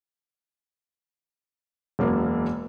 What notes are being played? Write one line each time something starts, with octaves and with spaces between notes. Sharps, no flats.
E1 F#2 A#3